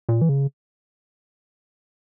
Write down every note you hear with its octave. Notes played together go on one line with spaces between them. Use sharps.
A#2
E3
C#3